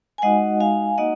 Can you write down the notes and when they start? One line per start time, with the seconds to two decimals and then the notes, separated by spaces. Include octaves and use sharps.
0.18 G#5
0.22 G#3 D#4 F#4 D#5 F#5
0.60 F5 G#5
0.98 A#3 D#4 F#4 D#5 F#5